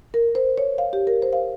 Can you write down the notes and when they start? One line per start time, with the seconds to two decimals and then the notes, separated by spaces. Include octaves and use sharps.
0.14 A#4
0.35 C5
0.58 C#5
0.78 F5
0.93 G4
1.07 A#4
1.22 C5
1.33 F5